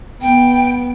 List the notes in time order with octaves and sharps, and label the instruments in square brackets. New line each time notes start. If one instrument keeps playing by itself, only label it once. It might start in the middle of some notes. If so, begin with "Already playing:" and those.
[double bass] B3 [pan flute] G5